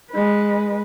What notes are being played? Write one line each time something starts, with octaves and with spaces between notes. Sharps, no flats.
G#3 B4